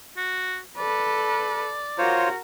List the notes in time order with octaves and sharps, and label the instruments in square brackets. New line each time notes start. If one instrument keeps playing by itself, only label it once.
[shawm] F#4
[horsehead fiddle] A4 B4 [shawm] D5
[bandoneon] F4 C5 C#5 [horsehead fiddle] F#4 A#4